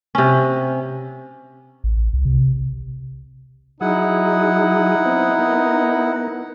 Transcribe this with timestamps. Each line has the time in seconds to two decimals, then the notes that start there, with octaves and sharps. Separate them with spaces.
0.15 C3 C#4
1.84 A1
2.13 C2
2.25 C3
3.81 F#3 D#4 E4 G#4 D#5 F#5
5.05 B3 C4
5.39 B3 A#4